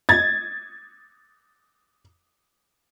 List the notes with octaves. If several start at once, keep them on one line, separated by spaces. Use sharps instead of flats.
G#6 A6